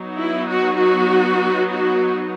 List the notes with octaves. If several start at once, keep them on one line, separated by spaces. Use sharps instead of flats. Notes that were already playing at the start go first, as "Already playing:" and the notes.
Already playing: F#3 B3 D#4
E4
F#4
F#4
F#4